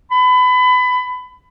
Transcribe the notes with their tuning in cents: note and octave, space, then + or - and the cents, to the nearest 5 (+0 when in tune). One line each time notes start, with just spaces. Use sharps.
B5 +25